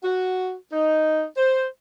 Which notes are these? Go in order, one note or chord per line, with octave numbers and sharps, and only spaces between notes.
F#4
D#4
C5